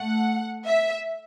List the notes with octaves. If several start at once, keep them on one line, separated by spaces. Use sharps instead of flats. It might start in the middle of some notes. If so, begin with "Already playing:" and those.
Already playing: A3 F#5
E5